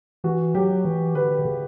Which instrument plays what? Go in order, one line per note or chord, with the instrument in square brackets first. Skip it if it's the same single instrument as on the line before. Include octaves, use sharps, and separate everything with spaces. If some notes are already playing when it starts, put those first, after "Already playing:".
[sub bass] E3 [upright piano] F#4
[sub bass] F#3 [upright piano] G4
[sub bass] E3
[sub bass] D3 [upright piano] B4
[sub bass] D3
C#3